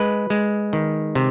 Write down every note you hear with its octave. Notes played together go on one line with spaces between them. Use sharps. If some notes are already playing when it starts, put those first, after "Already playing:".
Already playing: G#3 B4
G#3
D#3
C3